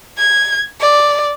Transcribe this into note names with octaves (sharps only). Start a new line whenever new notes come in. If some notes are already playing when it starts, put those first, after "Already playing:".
G#6
D5